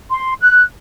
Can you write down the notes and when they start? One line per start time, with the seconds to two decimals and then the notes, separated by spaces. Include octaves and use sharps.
0.11 C6
0.40 F#6